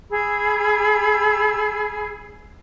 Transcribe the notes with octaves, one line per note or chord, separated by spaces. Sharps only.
G#4 B5 E6